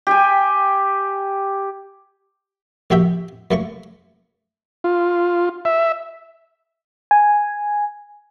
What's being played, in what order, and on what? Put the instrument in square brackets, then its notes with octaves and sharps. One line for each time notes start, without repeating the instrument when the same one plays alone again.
[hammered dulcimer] G4 G5 G#5
[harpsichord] A#1 A#3 F#4 G4 E5 G5
F#2 A3 A#3 C#6
[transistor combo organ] F4
E5
[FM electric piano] G#5